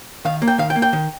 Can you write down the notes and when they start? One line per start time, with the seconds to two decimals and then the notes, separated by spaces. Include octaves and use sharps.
0.25 D#3 F5
0.42 A#3
0.48 G5
0.58 D#3 F5
0.70 G5
0.76 A#3
0.82 G5
0.93 D#3